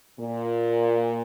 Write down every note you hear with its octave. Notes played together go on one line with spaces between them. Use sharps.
A#2